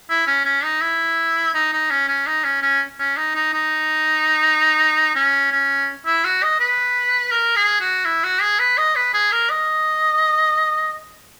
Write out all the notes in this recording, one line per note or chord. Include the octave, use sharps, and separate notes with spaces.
E4
C#4
C#4
D#4
E4
D#4
D#4
C#4
C#4
D#4
C#4
C#4
C#4
D#4
D#4
D#4
C#4
C#4
E4
F#4
D#5
B4
A#4
G#4
F#4
E4
F#4
G#4
B4
D#5
B4
G#4
A#4
D#5